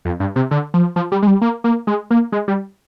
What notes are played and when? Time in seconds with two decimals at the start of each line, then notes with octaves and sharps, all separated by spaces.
0.05 F2
0.20 G2
0.36 C3
0.51 D3
0.74 F3
0.96 F3
1.12 G3
1.22 G#3
1.27 G3
1.41 A#3
1.64 A#3
1.87 G#3
2.11 A#3
2.32 G#3
2.48 G3